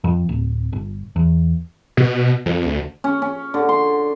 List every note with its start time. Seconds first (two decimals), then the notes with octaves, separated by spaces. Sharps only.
0.04 F2
0.29 D1
0.73 G1
1.16 E2
1.97 B2
2.46 F2
2.66 D2
3.04 C#4
3.22 C#4
3.54 D3
3.69 C6